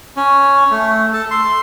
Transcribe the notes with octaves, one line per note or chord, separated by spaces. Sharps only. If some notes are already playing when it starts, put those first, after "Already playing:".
C#4
A3
A4
C6